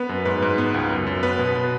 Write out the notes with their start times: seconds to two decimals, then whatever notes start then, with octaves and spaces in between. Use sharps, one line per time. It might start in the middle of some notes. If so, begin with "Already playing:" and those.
Already playing: B3 B4
0.09 F#2
0.25 G#2 B4
0.42 G#2
0.58 B3
0.74 C#2
0.90 F#2
1.07 F#2
1.23 B3 B4
1.39 B2
1.55 B3